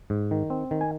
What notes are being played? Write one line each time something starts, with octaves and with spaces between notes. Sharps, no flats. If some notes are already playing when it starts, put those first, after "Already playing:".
G#2
D#3
C4
D#3
G#5